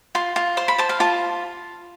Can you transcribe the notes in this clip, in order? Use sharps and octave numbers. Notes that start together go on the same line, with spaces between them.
F4 C6
F4
C5 C6
B5
C5 A5
F5
F4 A5